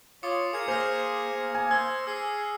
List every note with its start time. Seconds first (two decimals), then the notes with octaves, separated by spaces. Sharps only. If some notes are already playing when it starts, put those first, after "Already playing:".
0.23 F4 C#5 D6 D#6 C#7
0.53 G#4 A#4 G#6 C#7
0.68 A#3 C5 F6 A#6 F7
1.55 G#5
1.71 C5 E6 G#6
2.07 G#4 E6 C7